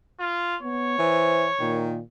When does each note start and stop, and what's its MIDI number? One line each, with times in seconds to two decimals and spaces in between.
0.20 0.56 65
0.62 0.96 59
0.62 1.89 73
0.99 1.48 52
0.99 1.45 72
1.60 2.00 46
1.60 2.00 51